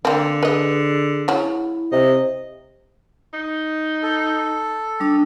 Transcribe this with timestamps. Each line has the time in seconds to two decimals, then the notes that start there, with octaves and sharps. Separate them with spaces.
0.05 D3 A#3 C4
0.43 G#4 B4 D#5
1.28 C#3 F#3 E4
1.92 C3 D#5
3.33 D#4
4.03 A4
5.00 G3 D4 D#6